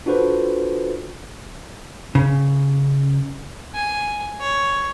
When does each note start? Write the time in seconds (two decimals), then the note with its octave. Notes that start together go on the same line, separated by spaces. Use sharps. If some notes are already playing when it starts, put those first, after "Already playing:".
0.06 D4 F4 F#4 A4 B4 C5
2.15 C#3
3.75 G#5
4.41 C#5